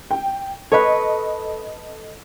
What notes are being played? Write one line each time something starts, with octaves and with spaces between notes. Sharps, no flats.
G5
A4 B4 C#5 D#5